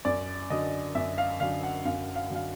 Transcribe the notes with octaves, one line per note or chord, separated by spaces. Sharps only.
F#2 D5
D3 F#3 D#5
F#2 E5
F5
D3 F#3 F5
F#5
F#2 F5
F5
D3 F#3 F5